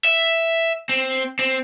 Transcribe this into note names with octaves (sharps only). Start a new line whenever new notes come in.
E5
C4
C4